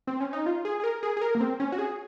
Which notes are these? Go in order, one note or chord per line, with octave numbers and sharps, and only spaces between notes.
C4
C#4
D#4
F4
G#4
G#4
A#4
G#4
G#4
A#4
A#3
C4
C#4
F#4
G#4